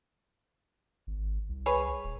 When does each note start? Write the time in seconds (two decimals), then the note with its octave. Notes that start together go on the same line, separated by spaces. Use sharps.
1.07 G#1
1.49 C2
1.66 G#4 B4 C#5
2.04 D#1